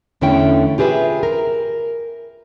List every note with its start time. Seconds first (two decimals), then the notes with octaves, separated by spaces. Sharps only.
0.21 E2 D3 A3 C#4 E4 G5
0.78 F4 G4 G#4 B4 E5
1.23 A#4